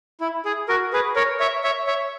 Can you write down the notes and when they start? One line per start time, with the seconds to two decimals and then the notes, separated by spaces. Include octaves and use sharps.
0.20 E4
0.45 G#4
0.68 F#4 A#4
0.93 G#4 B4
1.16 A#4 C#5
1.40 C#5 E5
1.64 C#5 E5
1.87 C#5 E5